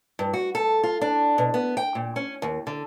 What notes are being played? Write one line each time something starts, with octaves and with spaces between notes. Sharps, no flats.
G2
F#4
A4
F4
D4
B2
B3
G5
A#2
C#4
D#2
D3